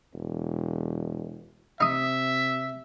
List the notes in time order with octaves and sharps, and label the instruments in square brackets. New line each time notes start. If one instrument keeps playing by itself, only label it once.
[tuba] E1
[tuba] C3 [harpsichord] D#4 D#6 [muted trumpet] E5